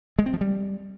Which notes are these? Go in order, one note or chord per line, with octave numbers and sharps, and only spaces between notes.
G#3
C4
F3
G3